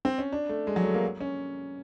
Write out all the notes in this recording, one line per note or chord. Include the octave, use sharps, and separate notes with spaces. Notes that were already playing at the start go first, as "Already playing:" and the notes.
C4
C#4
D4
A3
G#3
F#3
A3
A#3
C#4